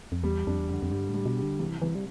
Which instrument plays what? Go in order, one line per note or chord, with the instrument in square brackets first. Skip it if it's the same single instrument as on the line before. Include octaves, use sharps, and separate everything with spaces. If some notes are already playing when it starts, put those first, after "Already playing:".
[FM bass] F2
[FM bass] E2 [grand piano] G3
[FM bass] F2 [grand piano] D4
[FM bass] E2
[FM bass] F2 [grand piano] D3
[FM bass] F2
[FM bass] G2 [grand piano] G3
[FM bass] A2
[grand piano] G3
[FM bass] B2
[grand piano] G4
[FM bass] D3
[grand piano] C2 [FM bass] E3
[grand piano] C2 [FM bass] E3
[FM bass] G3